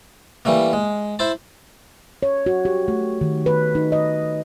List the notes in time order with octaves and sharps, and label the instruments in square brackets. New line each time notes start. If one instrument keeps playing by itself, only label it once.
[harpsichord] E3 G3 A3 A#3
G#3
E4 C5 A5
[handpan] C#5
F#4
G4
A3
D#3
B4
D#4
D#5